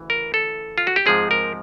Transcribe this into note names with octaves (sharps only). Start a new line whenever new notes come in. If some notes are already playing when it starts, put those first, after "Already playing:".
Already playing: D2 C#3 E3
A#4
A4
F4
F#4
G4
G#2 F3 G#3 C4 G#4
A#4